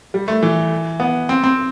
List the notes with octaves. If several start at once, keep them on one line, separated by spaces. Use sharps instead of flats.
G3
A3
E3
B3
C4
C4